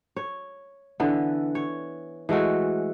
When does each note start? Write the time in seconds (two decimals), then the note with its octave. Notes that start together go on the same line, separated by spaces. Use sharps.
0.16 C#5
1.00 D3 E3 B3
1.55 C#5
2.29 E3 G#3 A3 F#4